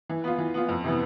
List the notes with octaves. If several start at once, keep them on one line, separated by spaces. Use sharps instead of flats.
E3
B3 F4
E3
B3 F4
F2
C3 E3 B3